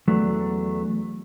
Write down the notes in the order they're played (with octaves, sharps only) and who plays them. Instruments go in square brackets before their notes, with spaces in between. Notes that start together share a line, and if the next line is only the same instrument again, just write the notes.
[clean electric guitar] E2 F#3 A3 D4